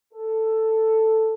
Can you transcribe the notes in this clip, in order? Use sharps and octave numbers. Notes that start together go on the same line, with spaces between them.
A4